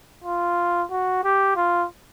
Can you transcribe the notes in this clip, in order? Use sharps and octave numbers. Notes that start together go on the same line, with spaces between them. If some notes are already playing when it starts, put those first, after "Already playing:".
F4
F#4
G4
F4